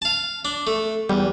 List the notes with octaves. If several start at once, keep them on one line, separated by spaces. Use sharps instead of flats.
F5 A5
D4
A3
E2 G3